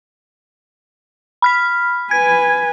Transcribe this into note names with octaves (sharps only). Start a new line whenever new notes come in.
B5 F6 B6
B4 G#5 G#6